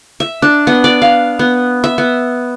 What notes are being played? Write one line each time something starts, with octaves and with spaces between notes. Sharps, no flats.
E5
D4
B3
D5
F5
B3
E5
B3